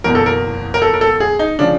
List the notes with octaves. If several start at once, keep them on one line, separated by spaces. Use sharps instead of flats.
F#1 E2 B2 A#4
A4
A#4
A#4
A4
A#4
A4
G#4
D#4
C#3 F3 D4